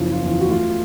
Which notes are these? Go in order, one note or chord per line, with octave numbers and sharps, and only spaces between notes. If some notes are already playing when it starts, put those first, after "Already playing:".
Already playing: F#1 F3
F4
E2
F4
F#4
A3 F4